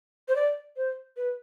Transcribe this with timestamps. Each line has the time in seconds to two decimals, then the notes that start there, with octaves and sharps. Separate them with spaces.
0.28 C5
0.35 D5
0.77 C5
1.17 B4